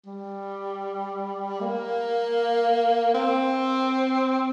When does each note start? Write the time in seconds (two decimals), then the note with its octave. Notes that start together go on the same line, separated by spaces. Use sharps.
0.06 G3
1.61 A#3
3.15 C4